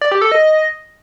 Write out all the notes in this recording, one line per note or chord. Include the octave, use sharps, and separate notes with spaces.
D5
G4
A4
D#5